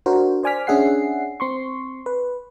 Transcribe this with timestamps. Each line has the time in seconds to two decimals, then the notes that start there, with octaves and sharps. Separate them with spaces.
0.06 D4 F#4 A#4 C5
0.43 C5 D5 G#5 D6 F6 B6
0.67 C#4 D4 G#4 E5 F#5 C7
1.40 C4 C6 C#6
2.06 B4